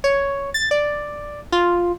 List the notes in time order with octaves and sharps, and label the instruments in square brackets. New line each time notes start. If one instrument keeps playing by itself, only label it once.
[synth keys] C#5
A6
D5
F4